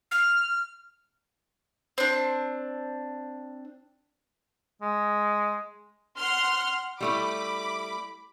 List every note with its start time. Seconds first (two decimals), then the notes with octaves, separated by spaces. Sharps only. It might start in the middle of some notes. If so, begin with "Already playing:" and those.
0.11 F6
1.98 C4 D4
4.82 G#3
6.16 F#5 C6 F6
7.01 G3 A3 E4 B5 D6